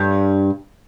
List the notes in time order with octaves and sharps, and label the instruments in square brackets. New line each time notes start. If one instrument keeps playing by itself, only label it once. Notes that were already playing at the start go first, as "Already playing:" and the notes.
Already playing: [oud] G2 G3